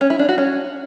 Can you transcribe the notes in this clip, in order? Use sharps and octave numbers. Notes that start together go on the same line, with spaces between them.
C#4
E4
D4
F#4
C#4